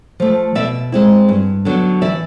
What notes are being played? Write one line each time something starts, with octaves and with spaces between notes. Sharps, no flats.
F3 A3
B2 D5 E5
G#3 C4 E4
G2
D3 F#3 B3 D4
E3 D5 E5